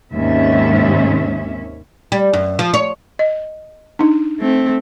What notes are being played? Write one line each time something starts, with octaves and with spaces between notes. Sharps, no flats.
D#2 G#2 C3 C#4 E5
G3
F#2
F3
C#5
D#5
D4 D#4
A3 C4